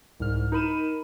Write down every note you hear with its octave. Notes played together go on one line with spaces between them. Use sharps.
C2 G#2 F6
D#4 A#4 B5 D#7 E7